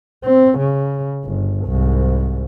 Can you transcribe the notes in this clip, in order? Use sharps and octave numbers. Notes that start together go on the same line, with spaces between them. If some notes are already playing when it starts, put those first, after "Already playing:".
C4
C#3
G1
C2 G#2